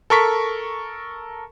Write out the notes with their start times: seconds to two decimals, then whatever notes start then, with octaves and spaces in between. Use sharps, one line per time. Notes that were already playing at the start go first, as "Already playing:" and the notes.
0.10 A4 A#4 C#6 B6